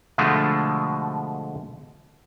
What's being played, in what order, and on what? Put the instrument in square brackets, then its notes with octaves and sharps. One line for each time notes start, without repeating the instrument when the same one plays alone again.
[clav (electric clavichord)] B2 D3 F3 G#3 A3